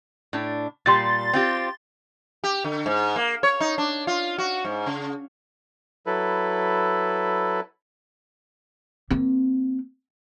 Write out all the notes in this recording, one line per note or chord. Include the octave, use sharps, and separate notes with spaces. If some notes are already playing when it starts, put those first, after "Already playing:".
A2 D4
A#2 G3 C6 A6
C4 F4 G4
G4
D3
G#2
A#3
C#5
D#4
D4
F4
F#4
G#2
C#3
F#3 E4 A4 B4
A#3 C4